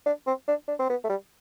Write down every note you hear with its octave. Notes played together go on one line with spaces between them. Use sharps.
D4
C4
D4
D4
C4
B3
A3
G3